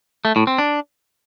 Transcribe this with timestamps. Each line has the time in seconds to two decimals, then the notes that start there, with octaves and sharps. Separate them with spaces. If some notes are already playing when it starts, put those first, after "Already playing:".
0.25 A3
0.36 A2
0.47 C4
0.58 D4